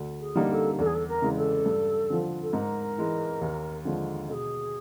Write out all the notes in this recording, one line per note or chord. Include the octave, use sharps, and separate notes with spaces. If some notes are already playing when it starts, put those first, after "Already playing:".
Already playing: D2
G#4
D3 G3 A#3 D#4
A4
E2 A4
G#4
A4
A#4
C#3 E3 G#3
A4
G2
D3 F3
A4
G#2 A#4
E3 G#3
D#2
D3 F3 G#3
B2 G#4 A4